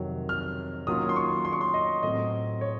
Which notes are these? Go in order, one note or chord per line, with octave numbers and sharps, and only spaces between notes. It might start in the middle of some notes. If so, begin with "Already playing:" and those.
Already playing: F2 C3 D#3 F#3
F6
D#3 F#3 A#3 C#4 F4 D#6
C6
C#6
C6
C#6
C6
D#5
A2 F#3 C4 D#5
C#5